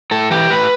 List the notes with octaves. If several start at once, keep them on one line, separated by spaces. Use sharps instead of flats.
A2 A4
E3 G4
A2 B4